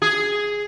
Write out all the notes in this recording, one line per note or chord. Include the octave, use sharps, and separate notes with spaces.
G#4